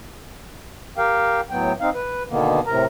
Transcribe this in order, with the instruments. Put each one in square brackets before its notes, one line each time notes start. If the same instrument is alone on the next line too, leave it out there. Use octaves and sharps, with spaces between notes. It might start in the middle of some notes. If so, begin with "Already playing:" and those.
[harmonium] G4 A#4 F5 G5
A2 F#3 B3 G5
C4 D#4 F5
B4
B2 D3 D#3 A#3 B3
A2 C3 A#4 A#5